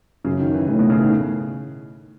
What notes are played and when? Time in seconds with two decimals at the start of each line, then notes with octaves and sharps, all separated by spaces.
0.25 F#2 C#3
0.39 D#3
0.54 E3
0.68 A2 D#3
0.79 B2
0.90 C#3
1.01 D#3